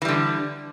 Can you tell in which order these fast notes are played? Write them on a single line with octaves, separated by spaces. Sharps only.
E3 G3 D3